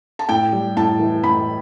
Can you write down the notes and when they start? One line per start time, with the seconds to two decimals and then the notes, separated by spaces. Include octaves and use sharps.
0.19 A5
0.29 A2 G5
0.52 G3
0.77 A2 A5
0.99 E3
1.24 A2 B5